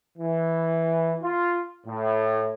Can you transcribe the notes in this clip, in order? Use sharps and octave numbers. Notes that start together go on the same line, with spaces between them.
E3
F4
A2